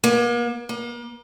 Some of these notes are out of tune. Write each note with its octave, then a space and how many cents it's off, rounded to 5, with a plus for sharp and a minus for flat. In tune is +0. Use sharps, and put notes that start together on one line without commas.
A#3 +40
A#3 +40